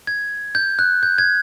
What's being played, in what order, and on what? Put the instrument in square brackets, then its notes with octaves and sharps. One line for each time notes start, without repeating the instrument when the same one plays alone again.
[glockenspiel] G#6
G6
F#6
G6
G#6